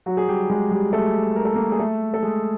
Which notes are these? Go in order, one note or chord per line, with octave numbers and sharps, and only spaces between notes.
F#3 F#4
G#4
G3 G4
G#3 G#4
G3 G4
A3 A4
A#4
A4
A#3 A#4
G#4
A3 A4
A4
G#3 G#4